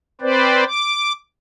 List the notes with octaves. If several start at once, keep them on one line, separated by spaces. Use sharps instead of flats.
C4 B4 C5 D5
D6